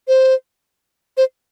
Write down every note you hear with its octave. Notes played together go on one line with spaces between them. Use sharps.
C5
C5